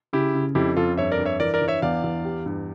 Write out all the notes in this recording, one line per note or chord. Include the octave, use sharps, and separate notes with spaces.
C#3 E4 G4
C#3
F2 E4 G4
F2 F4 A4
G2 C#5 E5
A#4 D5
G2
C#5 E5
E3 A#4 D5
A#4 D5
E3
C#5 E5
E2 D5 F5
E2
G4
G2